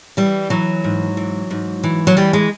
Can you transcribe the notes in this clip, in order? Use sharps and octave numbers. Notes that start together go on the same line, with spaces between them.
E3 G3
E3 F#3
G#2
E3
G#2
E3
F#3
E3 G3
G#3